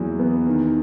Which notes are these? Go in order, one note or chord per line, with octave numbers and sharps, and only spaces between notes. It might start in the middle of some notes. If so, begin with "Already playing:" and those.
Already playing: E2 F#3 B3
B3
D#3